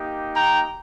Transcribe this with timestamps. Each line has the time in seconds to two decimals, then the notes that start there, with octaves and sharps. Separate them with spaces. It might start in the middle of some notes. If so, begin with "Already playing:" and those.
Already playing: A#3 D#4 G4
0.34 G5 A#5